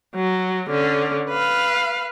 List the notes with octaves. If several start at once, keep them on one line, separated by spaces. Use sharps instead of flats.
F#3
D3 C#4
B4 F5